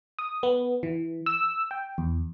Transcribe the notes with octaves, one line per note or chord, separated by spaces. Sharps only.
D#6
B3
E3
E6
G5
E2